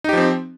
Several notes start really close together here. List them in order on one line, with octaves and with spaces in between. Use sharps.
D#4 G4 F3 C4